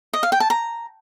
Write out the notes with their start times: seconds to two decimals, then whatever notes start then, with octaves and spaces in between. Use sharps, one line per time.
0.13 D#5
0.23 F5
0.32 G5
0.40 A5
0.50 A#5